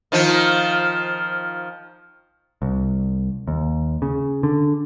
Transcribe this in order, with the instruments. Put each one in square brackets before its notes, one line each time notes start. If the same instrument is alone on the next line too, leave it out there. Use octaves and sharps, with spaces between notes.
[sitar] D#3 F3 F4
[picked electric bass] C2
D#2
C#3
D3